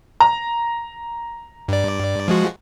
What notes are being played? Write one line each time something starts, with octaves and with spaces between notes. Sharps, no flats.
A#5
G2 D5
F3 G#3 F#4